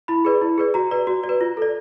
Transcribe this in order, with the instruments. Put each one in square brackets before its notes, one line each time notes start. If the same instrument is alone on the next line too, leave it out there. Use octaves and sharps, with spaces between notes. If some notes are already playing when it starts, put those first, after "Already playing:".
[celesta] E4 B5
G#4 B4 D5
E4
G#4 B4 D5
F#4 A#5
B4 D5
F#4
D5
B4
F4
A4 D5